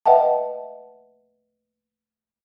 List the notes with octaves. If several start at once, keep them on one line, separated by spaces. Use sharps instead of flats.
B4 D#5 E5 F#5 G5 A5